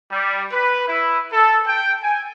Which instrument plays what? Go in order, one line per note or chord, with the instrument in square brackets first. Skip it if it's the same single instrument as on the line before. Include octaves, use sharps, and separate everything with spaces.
[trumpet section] G3
B4
E4
A4
G5
G#5